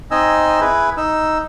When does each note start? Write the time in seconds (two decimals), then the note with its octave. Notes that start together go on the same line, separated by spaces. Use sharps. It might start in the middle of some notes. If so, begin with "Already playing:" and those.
0.11 C4 D#4 D#5 G#5 E6
0.61 E4 G#4 B4
0.97 D#4 E6